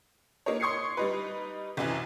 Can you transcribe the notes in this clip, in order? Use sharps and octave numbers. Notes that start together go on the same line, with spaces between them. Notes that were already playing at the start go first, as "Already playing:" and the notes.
A#3 D#4 C#5
C6 C#6 D#6 G#6 C7 C#7
G3 D#4 B4
C2 F#2 E3